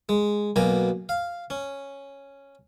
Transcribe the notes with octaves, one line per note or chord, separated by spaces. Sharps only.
G#3
B1 B2 A#3 G#5 A#5
F5
C#4